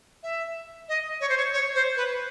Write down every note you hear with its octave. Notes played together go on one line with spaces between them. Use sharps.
E5
D#5
C#5
C5
C#5
C#5
C5
B4